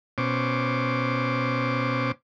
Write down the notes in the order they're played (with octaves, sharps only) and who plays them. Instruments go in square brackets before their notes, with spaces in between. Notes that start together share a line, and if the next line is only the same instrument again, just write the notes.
[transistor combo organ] B2 C#4 C5 D6